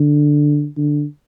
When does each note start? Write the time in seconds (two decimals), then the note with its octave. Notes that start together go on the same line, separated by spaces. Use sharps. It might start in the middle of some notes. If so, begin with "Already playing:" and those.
Already playing: D3
0.77 D3